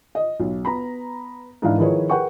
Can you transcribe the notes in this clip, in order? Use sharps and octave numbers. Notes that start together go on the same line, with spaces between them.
D#5
B1
B3 A#5 B5
G#2 E3 D4 E4 F5
D#3 F3 E4 G#4 B4 C#5
G#4 A#4 B4 F#5 G5 C#6